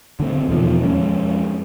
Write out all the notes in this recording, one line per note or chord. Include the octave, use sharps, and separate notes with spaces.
D3 A3 C4
E2 B2 D#3 F3
F2 G#3 C#4